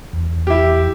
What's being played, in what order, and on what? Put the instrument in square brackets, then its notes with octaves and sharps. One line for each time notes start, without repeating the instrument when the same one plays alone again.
[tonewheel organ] E2
[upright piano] E4 G4